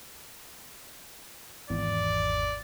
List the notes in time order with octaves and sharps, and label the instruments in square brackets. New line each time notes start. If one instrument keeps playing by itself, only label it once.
[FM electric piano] G#1 E2 [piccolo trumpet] D5